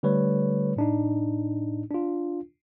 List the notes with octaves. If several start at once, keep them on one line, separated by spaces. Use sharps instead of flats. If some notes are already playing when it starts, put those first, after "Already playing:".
D3 G3 A3 B4 C#5
A2 D4 D#4
D4 F4